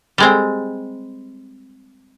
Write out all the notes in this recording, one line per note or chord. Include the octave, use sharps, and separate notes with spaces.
G3 G#3 C4